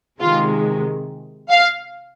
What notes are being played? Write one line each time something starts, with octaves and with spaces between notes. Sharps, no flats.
C3 D#3 G#3 F4
F5